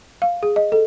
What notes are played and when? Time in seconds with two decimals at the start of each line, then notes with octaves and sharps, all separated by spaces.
0.22 F5
0.43 G#4
0.56 D#5
0.72 A4